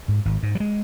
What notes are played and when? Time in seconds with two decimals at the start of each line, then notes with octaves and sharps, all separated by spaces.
0.08 G#2
0.25 G#1
0.43 G#2
0.55 F#3
0.60 G#3